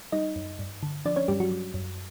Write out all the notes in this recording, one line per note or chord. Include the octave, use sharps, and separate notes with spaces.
G3 D#4 D#5
F#2
G2
D3
F3 D4 D5
C#4 C#5
G2 G3 G4
F#3 F#4
G3
F#2